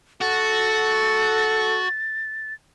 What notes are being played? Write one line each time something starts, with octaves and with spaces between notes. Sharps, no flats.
F#4 A4 A6